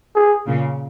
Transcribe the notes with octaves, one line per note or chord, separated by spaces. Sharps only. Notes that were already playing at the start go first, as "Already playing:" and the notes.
G#4
A#2 C#3